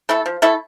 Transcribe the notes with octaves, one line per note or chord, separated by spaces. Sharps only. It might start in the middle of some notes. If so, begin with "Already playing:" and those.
A3 E4 A4
F3
A3 E4 A4